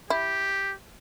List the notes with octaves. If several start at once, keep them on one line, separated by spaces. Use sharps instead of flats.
E4 G4